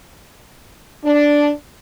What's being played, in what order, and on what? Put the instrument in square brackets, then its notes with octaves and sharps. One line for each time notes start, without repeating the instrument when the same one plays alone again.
[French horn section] D4